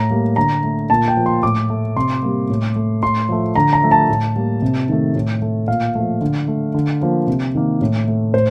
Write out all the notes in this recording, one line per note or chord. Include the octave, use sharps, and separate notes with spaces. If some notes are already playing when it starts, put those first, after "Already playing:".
Already playing: A2 A#5
G3 A#3
D3 A#5
A3
A#2 A5
G5
F3 A#3
C6
A2 D6
A3
C3 C6
G3 A#3
A2
A3
A2 C6
F3 A3
D3 A#5
A#5
F3 A3
A5
A2
G3 A#3
C3
D#3 A3
A2
A3
A#2 F5
F3 A3
D3
A3
D3
F3 A#3
C3
D#3 A#3
A2
A3
A2 C5